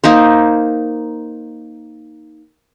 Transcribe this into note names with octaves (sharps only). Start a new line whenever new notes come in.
A#3 D#4 C5